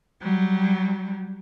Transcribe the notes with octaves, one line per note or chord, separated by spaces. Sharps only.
F#3 G3